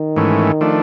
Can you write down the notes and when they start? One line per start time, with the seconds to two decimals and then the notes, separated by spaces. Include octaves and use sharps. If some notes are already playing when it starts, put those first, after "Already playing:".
Already playing: D#3
0.16 G#2 E3 A3 C#4
0.61 F3 A3 D4